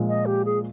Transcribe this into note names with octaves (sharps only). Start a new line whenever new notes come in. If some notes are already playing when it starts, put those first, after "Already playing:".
Already playing: A#2 F3 G#3
D#5
G4
G#4